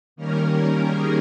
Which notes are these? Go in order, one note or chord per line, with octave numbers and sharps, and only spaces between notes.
D#3 G3 A#3 C#4 A#4
G#4